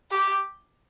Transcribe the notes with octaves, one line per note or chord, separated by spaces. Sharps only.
G4